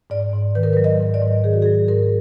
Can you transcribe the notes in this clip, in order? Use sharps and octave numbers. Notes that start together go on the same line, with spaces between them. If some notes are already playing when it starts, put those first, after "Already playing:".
G#2 D5
G#2
D#3 B4
A#4
F#3 B4
D#5
G#2
D5
G#2
D#3 G#4
F#4
F#3 G#4
G#2 A#4